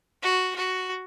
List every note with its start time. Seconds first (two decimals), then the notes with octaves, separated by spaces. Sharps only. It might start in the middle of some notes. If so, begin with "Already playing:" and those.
0.23 F#4
0.56 F#4